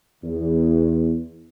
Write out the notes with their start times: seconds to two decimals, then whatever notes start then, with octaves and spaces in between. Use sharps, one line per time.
0.24 E2